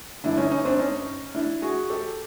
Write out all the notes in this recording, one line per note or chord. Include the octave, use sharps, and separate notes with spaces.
G1 G2 D3 D4 E4
C#4 D#4
C#4 D#4
C4 D4
C#4 D#4
D4 E4
F#4 G#4
G4 A4